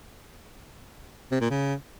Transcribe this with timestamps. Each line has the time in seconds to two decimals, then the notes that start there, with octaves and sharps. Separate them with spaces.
1.32 C3
1.41 A#2
1.50 C#3